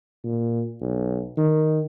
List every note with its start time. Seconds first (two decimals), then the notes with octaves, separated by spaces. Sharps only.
0.24 A#2
0.81 B1
1.37 D#3